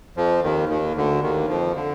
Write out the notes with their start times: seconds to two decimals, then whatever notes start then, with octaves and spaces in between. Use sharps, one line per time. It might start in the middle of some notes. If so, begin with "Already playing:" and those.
0.17 F2 F3
0.43 D#2 D#3
0.69 D#2 D#3
0.96 D2 D3
1.23 D#2 D#3
1.48 F2 F3
1.76 D3